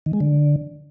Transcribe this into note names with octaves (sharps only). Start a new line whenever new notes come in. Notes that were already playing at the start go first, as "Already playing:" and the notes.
D#3
G#3
D3